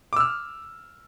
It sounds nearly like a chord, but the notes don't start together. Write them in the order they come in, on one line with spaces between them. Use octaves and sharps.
D6 E6 F6